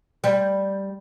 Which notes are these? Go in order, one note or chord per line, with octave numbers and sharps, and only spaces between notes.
G3